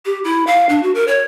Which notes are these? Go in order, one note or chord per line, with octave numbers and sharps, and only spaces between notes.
G4
E4
F5
D4
F#4
A#4
C#5